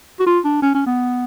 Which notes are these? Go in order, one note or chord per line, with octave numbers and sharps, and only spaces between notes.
F#4
F4
D4
C#4
C#4
B3